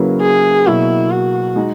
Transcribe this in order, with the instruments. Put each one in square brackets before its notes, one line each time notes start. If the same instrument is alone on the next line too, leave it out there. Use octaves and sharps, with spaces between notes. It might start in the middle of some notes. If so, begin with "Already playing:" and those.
Already playing: [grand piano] C#3 F#3 A#3 E4 B4
[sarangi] G#4
[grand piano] B2 F#3 A#3 [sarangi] E4
[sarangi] F#4
[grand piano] G#3 D#4 G#4